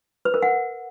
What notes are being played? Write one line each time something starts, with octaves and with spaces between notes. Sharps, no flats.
B4
A#4
F#5